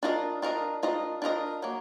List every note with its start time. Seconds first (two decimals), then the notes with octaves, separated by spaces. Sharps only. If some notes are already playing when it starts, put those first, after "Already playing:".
0.03 D4 F4 A#4 D#5
0.42 D4 F4 A#4 D#5
0.83 D4 F4 A#4 D#5
1.22 D4 F4 A#4 D#5
1.62 F#3 A#3